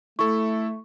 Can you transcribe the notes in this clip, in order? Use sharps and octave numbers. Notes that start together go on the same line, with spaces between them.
A3 E4 A4 C#6